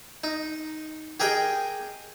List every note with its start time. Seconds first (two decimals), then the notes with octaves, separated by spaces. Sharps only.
0.24 D#4
1.20 G4 G#4 A#4 D#5 G5